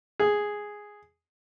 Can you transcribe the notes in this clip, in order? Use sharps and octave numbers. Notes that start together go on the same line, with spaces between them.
G#4